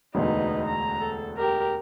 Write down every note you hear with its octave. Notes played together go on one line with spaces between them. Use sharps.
E1 D2 D#4 B4
A#5
A4
G4 A#4